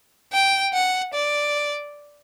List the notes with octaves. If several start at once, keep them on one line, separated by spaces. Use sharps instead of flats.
G5
F#5
D5